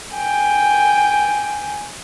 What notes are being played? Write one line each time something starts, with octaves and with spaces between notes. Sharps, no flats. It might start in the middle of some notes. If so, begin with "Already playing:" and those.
G5 G#5